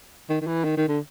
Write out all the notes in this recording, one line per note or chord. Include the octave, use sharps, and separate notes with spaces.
D#3
D#3
E3
D#3
D#3
D3